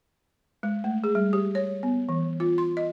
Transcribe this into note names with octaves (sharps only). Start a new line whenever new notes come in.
G#3
A3
G#4
G3
G4
C#5
B3
E3
F4
C6
D#5